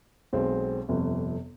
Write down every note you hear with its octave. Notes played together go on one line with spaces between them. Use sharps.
B1 B2 G#3 C4
G1 F2 C3